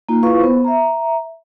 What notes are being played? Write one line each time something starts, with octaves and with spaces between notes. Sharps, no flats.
A#3 D#4 F4
E4 F4 G#4 B4 F5 C#6
B3 C5
E5 A#5